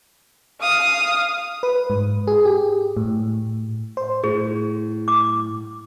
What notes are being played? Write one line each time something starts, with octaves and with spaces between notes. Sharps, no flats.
F5 D#6
B4
G#2
G#4
G4
A2
C5
A2 G#4
D6